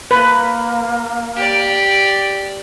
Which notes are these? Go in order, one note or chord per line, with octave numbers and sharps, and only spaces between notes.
A#3 B4
G4 D5